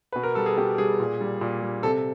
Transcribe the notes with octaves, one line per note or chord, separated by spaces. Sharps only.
B2 B4
A#4
G3 A4
G#4
B2 G4
G3 G#4
A#2
G3
A#2
G3
C3 A4